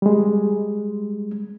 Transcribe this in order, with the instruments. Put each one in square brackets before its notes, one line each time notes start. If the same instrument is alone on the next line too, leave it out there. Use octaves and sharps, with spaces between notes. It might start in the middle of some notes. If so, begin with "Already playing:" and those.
[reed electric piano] G3 G#3